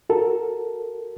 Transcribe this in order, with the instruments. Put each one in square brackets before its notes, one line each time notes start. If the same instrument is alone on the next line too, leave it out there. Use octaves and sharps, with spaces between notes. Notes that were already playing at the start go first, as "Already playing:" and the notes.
[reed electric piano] F#4 A4 A#4